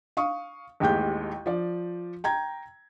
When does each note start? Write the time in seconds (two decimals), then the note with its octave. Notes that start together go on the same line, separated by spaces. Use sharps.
0.17 F5 C#6 D#6
0.80 A1 D#2 G#3 G4 G6
1.46 F3 D5
2.24 G5 A#5 G#6